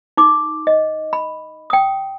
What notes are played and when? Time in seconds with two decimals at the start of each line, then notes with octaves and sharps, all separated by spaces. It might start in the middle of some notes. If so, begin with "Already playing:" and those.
0.17 D#4 D6
0.67 D#5
1.13 B5
1.70 G5 D#6